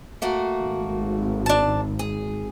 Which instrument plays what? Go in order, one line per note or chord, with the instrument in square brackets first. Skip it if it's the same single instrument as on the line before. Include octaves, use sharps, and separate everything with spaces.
[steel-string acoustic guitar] A3 A#3 F#4
[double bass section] G#1
[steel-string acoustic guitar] D4 A5
G#4